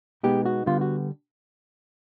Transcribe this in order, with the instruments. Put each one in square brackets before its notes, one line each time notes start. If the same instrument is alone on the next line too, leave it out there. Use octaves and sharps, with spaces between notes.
[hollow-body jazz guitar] B2 G#3 B3 D#4 G4
F#4
D3 G3 B3 F4
F#4